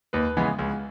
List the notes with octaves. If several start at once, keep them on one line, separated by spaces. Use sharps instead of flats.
D#2 B4
C#3 E3 G#3 B3
C#2